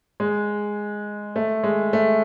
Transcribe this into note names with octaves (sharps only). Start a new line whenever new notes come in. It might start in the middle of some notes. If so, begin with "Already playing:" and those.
G#3
A3
G#3
A3